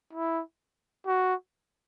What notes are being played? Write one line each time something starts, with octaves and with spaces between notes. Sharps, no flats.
E4
F#4